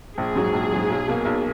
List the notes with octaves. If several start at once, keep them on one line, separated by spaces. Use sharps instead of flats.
A#1 G#4
G#2 F#3
A#1
G#2 F#3
B1
B2 A#3
B1